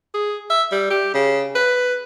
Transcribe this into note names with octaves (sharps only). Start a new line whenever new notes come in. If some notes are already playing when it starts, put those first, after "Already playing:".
G#4
E5
G3
G4
C#3
B4